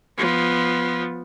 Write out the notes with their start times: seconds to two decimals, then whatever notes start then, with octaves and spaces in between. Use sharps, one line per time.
0.18 F3 B3